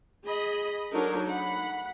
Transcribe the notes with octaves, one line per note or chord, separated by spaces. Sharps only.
G#4 D#5 B5
F#3 D4 D#4 A4 A#4
F#5 B5